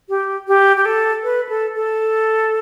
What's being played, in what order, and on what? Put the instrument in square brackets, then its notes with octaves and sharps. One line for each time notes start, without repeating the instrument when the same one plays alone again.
[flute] G4
G4
G4
A4
B4
A4
A4